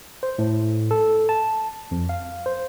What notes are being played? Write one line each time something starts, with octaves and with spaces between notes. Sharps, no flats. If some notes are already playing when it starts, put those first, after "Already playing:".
C5
A2
A4
A5
F2
F5
C5